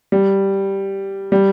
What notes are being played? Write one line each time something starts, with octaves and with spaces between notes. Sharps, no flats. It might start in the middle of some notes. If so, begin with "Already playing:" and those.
G3
G3